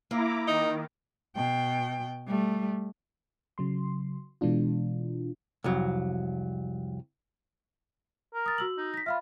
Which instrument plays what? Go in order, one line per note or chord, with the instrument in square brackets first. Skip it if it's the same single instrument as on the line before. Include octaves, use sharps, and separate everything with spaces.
[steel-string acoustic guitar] A#3 [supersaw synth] E4 A#5 D6
[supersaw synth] D#3 [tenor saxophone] D#4
[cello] B2 G5
G3 A3
[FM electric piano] C#3 F#3 C6
B2 E3 G#3 D4 F4
[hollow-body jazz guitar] C2 F2 F#3
[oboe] A#4
[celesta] D#6 A6
F#4 E6 F#7
[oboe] D#4
[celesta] A#6 B6
[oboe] F4 [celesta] E5 F5 B5